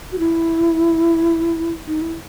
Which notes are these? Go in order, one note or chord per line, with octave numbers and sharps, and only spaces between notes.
F#4
E4
D#4
E4